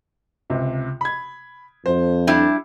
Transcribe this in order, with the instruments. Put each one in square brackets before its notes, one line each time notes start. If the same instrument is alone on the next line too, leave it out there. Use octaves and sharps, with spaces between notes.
[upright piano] C#2 C3
B5 G#6
[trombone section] F2 [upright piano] C5
[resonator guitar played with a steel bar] G3 D4 E4